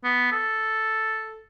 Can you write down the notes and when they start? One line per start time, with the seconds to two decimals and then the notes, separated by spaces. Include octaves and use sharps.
0.04 B3
0.32 A4